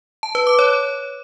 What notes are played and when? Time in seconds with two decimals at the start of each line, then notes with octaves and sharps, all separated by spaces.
0.23 A5
0.35 B4
0.47 D6
0.59 C#5